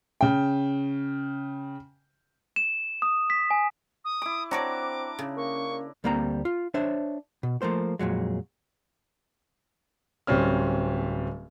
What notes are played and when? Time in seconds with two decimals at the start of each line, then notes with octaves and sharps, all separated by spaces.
0.21 C#3 G5
2.56 E7
3.02 D#6
3.30 B6
3.51 G#5
4.04 D#6
4.22 E4 D6
4.51 C4 D4 F#4 C#5 D5 A#5 D6
5.19 C#3
5.36 A#3 C#6
6.04 D2 G3 A#3 C4 E5 A#5
6.45 F4
6.74 D4 C5 C#5 E5
7.43 B2
7.62 F3 A3 A#3 C5
7.99 F2 A#2 F#3 G#3
10.27 D1 G3 C4 C#4 F6